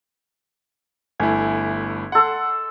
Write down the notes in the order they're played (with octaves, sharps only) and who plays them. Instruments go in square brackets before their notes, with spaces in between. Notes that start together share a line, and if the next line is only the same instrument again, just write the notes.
[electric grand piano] G1 A3 E4 [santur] G#5
[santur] A4 C6 [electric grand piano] F#5